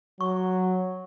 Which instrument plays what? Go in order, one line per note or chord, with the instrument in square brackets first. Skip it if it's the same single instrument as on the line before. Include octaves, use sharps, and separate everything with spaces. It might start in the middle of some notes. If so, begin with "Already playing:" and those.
[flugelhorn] F#3 [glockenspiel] C#6